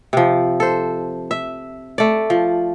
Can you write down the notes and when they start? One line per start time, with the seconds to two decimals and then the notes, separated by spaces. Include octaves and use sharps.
0.13 C3 F3
0.60 A4 C5
1.31 E5
1.98 A3 D5
2.30 F3